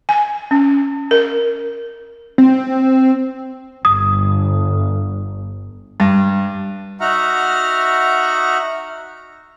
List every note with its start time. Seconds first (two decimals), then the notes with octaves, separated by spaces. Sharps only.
0.09 G#5
0.51 C#4
1.11 A#4
2.38 C4
3.85 G1 D#6
6.00 G2
7.01 D#4 F#4 E5 F#5 A#5 F6